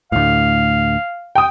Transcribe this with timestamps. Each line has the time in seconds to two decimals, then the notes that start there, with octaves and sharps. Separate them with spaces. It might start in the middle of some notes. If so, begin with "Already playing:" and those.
0.12 D2 A2 F5
1.35 G5 D#6